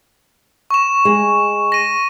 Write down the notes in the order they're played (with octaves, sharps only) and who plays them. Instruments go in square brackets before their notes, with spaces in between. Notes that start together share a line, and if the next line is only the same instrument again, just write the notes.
[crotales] C#6 E7
[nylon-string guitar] G#3
[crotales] A#6 D#7